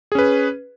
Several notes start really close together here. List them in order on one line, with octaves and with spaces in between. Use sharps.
G#4 C#4 B4